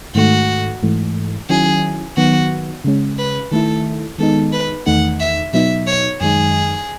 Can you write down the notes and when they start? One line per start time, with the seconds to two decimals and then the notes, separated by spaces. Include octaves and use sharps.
0.15 G#2 D#3 A3 F#4
0.83 G#2 E3 A3
1.49 D#3 F#3 C#4 E4 G#4
2.17 D#3 F#3 B3 F#4
2.84 C#3 G#3 C#4
3.18 B4
3.52 D#3 A3 E4 A4
4.18 D#3 G#3 B3 D#4 A4
4.52 B4
4.86 E2 D#3 A3 D#4 F#5
5.20 E5
5.53 B2 F#3 B3 D#4 E5
5.87 C#5
6.21 F#2 D#3 G#3 D#4 G#4